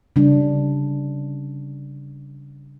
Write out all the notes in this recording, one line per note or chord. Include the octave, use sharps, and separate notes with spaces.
C#3 G3 D4